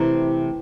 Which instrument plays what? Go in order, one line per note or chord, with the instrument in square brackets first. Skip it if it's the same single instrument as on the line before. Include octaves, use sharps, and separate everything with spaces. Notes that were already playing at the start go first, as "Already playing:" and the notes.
Already playing: [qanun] C3 E3 A3 C4 [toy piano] E4